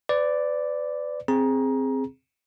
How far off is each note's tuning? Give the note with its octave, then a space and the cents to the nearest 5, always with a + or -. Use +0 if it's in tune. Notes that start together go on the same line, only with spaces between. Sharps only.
B4 +35 D5 +0
C4 +0 G#4 +0 A#5 +20